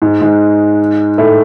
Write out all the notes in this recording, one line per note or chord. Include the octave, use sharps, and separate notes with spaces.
G#2 G#3
G#2 G#3
A2 A3